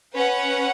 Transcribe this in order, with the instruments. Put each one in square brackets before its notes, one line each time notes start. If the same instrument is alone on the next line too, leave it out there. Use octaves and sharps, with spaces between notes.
[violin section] C#4 B4 F#5